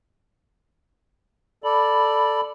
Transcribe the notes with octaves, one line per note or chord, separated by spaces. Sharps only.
A4 D5 B5